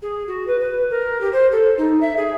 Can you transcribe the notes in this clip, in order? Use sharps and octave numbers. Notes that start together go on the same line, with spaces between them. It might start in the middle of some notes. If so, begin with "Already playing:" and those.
G#4
F#4
B4
B4
A#4
G4
C5
A4
D#4
E5
G#4